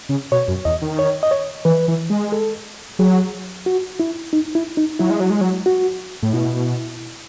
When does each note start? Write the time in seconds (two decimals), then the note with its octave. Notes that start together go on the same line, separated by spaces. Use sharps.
0.09 C#3
0.32 B2 C#5
0.48 F#2
0.65 E2 D#5
0.82 D#3
0.99 C#5
1.23 D#5
1.31 C#5
1.65 E3 B4
1.88 E3
2.10 G#3
2.32 A4
2.99 F#3 G#4
3.66 F#4
4.00 E4
4.33 D#4
4.55 E4
4.77 D#4
5.00 F#3 E4
5.10 G#3
5.20 F#3
5.30 G#3
5.41 F#3
5.66 F#4
6.23 A2
6.33 B2 E4